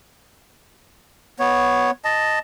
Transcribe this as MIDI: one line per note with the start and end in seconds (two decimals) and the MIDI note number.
1.39 1.91 59
1.39 1.91 73
2.05 2.39 75
2.05 2.39 81